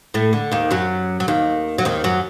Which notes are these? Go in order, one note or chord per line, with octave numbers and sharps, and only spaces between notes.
A2 A3
D3
D#2 D#3
F#2 F#3
F#3
D#2 D#3
F#3
D#2 D#3
F#2 F#3